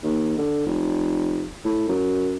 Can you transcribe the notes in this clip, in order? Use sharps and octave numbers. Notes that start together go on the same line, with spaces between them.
D#2
D3
F1
A2
F#2